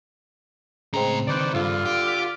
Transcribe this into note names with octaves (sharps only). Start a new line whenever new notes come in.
A2 C#3 G#3 C4 A#5
D3 D#3 B4 C5 D5
G2 D3 F4
G4 F5
D6 F6 B6